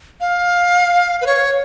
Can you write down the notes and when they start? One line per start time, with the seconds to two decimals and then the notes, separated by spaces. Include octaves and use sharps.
0.20 F5
1.21 B4
1.27 C#5